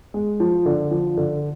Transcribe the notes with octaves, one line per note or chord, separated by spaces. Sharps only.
G#3
F3
D3
F3
D3